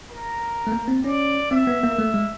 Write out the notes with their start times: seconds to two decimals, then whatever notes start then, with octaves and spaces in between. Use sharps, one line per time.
0.09 A#4
0.67 A3
0.72 A#3
0.88 C4
1.04 C#4 D5
1.51 C4 E5
1.67 B3
1.83 A#3
1.98 A3
2.14 G#3